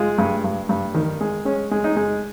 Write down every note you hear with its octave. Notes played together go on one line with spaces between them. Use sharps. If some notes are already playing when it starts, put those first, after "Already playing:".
Already playing: G#3 F4
G2
G2
G2
D#3
G#3
G#3 C#4
G#3
D#4
G#3